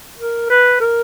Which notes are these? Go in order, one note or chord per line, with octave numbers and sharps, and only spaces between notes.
A#4
B4
A#4